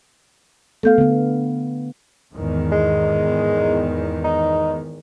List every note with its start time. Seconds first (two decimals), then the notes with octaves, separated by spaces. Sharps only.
0.83 A3 B3 A4 F5 G6
0.98 D3 B3
2.34 E2 G#2 D#3
2.72 G#3
4.24 D#4